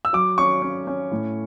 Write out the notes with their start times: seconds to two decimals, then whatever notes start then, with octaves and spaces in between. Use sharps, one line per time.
0.05 E6
0.13 F#3 D6
0.38 C#4 C#6
0.62 C#4
0.87 C#4
1.12 A2